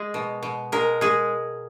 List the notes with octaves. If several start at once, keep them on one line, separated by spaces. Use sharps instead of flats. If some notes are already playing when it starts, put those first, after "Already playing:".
Already playing: G#3 G#4
B2
B2
G#3 A#4
G#3 G#4